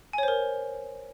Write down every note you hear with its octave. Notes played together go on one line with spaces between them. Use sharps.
A#4 C5 C#5 G#5